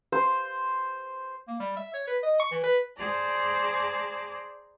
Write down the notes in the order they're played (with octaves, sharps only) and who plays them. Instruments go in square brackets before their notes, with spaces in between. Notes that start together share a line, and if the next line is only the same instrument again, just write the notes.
[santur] C5
[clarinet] A#3
G3
E5
C#5
B4
D#5
C#6
E3
B4
[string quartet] G#4 C5 D5 A5 A#5